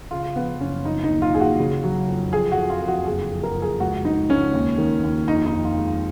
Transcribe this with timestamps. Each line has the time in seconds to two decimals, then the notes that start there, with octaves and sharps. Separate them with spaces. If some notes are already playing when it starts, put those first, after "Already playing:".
0.11 C#3 F4
0.36 F3 B3
0.60 F#1 C#4
0.85 F3 D#4
1.04 D#4
1.09 D#2
1.22 F4
1.34 D#2 G#4
1.40 F#4
1.59 C#3
1.84 F#3
2.08 F2
2.33 F2 G#4
2.52 F#4
2.57 F2
2.70 F4
2.82 F2
2.88 F#4
3.07 F#1 G#4
3.31 F3
3.43 A#4
3.56 F2
3.62 G#4
3.80 C#2 F#4
4.05 C#2 D#4
4.30 C#2 C#4
4.54 D#2
4.78 D#3
5.04 D#2
5.28 F2 D#4
5.46 D#4
5.53 F2
5.65 F4
5.78 G#3